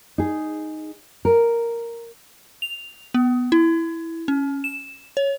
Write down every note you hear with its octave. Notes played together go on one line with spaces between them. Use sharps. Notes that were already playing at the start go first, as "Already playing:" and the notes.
D#4 G#4
A#4
F7
B3
E4
C#4
E7
C#5